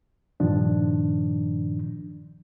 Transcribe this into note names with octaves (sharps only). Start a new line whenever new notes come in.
G2 A#2 D#3 F3 D4